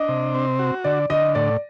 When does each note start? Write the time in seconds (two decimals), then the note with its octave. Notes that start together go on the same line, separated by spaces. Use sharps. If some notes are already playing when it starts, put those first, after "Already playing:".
Already playing: D4 D#5
0.09 C3
0.35 C4
0.59 F#4
0.84 D3 D5
1.10 D3 D#5
1.35 A2 D5